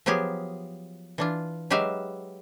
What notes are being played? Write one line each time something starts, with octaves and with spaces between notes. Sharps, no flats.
F3 F#3 B3 G4 G#4 F5
E3 D4 F4
F#3 G#3 G4 B4 E5 F5